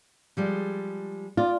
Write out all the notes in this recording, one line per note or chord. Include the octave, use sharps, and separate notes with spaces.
F3 G3 G#3
F4 D5